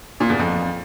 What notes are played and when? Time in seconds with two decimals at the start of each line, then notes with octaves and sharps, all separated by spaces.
0.20 A#2
0.30 E2
0.39 F2